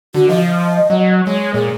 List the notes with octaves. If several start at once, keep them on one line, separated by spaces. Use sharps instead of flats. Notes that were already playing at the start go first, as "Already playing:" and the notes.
D3 F#4
F3 D#5
F#3
G#3 C#5
A#2 G#4